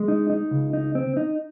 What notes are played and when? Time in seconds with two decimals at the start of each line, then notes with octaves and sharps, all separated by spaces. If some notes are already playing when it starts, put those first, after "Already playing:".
Already playing: G#3
0.08 D#4
0.30 D#4
0.51 C#2
0.73 D#4
0.95 C4
1.17 D#4